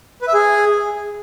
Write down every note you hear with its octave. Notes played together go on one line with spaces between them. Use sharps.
B4
E5
G#4